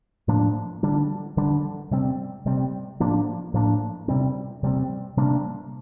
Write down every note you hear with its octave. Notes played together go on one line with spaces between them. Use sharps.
A2 F3 A#3 D4
D3 G3 D4
D3 G3 D4
C3 G3 C4
C3 G3 C4
A2 F3 A#3 D4
A2 F3 A#3 D4
C3 G3 C4
C3 G3 C4
C3 G3 A#3 D4